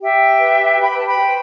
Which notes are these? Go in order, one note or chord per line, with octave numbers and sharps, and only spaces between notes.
G4 E5 G5
B4
G4 G5 B5
G5
A5
G5 B5
C5